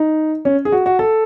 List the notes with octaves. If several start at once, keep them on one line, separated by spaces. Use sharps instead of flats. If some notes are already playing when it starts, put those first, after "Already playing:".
Already playing: D#4
C#4
G#4
F#4
F#4
A4